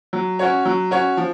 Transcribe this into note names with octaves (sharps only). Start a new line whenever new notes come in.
F#3
C#4 F#4 C#5
F#3
C#4 F#4 C#5
F3